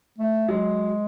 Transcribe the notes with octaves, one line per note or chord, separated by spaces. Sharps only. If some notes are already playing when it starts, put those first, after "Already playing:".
A3
F#3 G#3